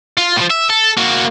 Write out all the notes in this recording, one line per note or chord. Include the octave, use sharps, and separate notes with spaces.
F4
A2 F3
E5
A4
A#3 F#4